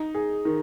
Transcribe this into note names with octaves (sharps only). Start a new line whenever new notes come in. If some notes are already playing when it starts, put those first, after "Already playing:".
Already playing: D#4
G#4
D#3